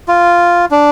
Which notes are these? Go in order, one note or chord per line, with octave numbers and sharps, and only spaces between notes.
F4
D4